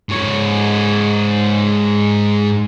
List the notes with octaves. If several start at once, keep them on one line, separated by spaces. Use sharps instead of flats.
G#2 C#5